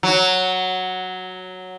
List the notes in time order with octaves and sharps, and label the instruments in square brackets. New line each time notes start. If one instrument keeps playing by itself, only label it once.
[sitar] F#3